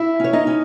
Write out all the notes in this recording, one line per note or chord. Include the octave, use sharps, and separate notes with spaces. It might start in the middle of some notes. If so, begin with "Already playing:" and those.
Already playing: E4 E5
C#4 C#5
D#4 D#5
C#4